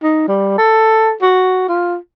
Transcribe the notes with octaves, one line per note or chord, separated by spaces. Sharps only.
D#4
G3
A4
F#4
F4